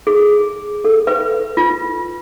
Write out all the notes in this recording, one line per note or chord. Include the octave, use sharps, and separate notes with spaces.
G#4
A4
B4
F4